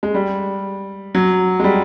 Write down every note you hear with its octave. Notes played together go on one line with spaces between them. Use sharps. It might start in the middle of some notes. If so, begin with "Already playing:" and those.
G#3
G3
F#3
G#3
G3